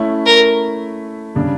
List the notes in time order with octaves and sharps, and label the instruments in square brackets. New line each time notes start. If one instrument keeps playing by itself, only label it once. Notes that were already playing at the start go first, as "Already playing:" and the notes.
Already playing: [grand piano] A3 C#4 E4
[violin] A#4
[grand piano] C#3 G3 D4